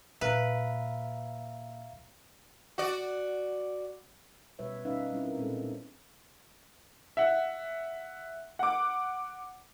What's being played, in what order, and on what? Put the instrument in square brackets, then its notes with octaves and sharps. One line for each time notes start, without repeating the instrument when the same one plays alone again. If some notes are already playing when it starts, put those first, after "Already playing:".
[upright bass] A#2 [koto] B4 [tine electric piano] E5 F5 A#5
[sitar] F#4 D5
[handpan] B2 G3 B4 C#5 E5
G3 C#4 D#4 B4 E5 F5
G3 C4 C#4 E4
A#4 B4
A#2 G#3 C4 C#4 G4 A4
D4 D#4
[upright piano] E5 F#5
[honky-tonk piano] F#5 D6